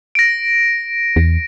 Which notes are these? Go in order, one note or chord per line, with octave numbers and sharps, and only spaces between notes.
A#6 D7
E2